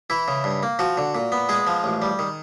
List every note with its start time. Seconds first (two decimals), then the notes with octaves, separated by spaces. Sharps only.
0.10 E3 E4
0.28 C#3
0.44 G2
0.63 A#3
0.79 F3 F#4
0.97 D3
1.15 A#2
1.32 B3
1.49 G#3 G#4
1.67 F3
1.84 A1
2.02 G3
2.19 D#3